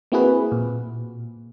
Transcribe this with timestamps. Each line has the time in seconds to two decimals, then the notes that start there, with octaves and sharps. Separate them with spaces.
0.12 A#3 C4 E4 F#4 G#4 B4
0.52 A#2